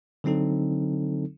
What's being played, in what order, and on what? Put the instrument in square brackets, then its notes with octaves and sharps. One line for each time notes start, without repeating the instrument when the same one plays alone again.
[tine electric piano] D3 F#3 C4 D#4 A4